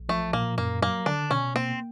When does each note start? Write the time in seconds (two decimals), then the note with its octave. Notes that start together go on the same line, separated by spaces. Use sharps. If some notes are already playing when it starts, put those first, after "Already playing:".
Already playing: A#1
0.09 F3 A3
0.33 A#2 A#3
0.58 F#2 A#3
0.82 F#3 A#3
1.06 D3 D4
1.30 B2 C#4
1.55 A#3 C4